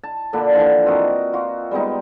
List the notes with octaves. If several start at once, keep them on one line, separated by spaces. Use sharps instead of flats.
A5
A#2 D3 D4 B5
D3 E3 F3
C4 F#4 A#4 D#5
F4 F#4
G3 G#3 B3 D#4